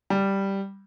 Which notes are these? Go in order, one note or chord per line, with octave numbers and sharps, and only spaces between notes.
G3